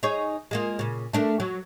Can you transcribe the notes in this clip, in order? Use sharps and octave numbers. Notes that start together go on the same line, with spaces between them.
D#4 G#4 C#5
G#3 A#3 F4
A#2 C#3
A3 D4 A#4
F#3